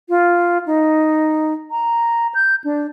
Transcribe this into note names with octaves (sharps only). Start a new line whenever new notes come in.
F4
D#4
A#5
G6
D4